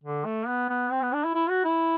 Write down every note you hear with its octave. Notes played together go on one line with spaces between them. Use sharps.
D3
A3
B3
B3
C4
B3
D4
E4
E4
F#4
E4